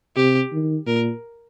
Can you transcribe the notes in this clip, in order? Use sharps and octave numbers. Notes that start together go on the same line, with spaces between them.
C3 G4
D#3
A#2 A#4